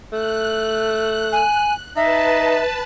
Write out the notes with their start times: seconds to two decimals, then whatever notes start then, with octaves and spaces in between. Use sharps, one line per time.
0.12 A3 F#6
1.32 G#5
1.96 D#4 B4 E5 A5